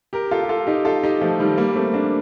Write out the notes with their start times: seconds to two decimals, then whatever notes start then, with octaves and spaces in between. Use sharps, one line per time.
0.13 G4 A#4
0.31 F4 A4
0.43 G4
0.49 F4 A4
0.67 D#4 G4
0.85 F4 A4
1.03 D#4 G4
1.21 F3 A3
1.39 D#3 G3
1.58 G3 A#3
1.76 A3 C4
1.94 A#3 D4